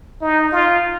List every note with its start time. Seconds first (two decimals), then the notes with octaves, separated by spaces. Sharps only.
0.22 D#4
0.52 F4